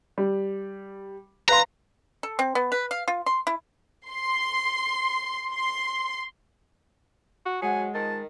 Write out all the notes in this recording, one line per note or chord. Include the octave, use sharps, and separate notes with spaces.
G3
B4 F5 A#5 C6
A4
C4
B3
B4
F5
F4
C6
E4
C6
C6
F#4
F#3 G#3 C5 F#5 G#5 A5
D#3 F4 C5 A5